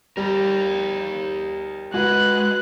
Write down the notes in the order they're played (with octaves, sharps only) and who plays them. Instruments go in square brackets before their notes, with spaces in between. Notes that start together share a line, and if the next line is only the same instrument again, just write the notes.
[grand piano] G3 [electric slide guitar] G4 A#4
[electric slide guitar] G#3 [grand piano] F#4 B4 [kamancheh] F#6